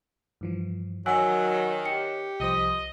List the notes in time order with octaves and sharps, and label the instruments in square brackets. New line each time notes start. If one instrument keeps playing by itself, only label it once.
[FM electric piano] G2 E3 F3
[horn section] D#3 [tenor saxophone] F#3 [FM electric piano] C#5 F#6 [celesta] F#5 G#5 E6
[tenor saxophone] G4 [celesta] G5 C#7
[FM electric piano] C2 F3 C5 [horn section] D#5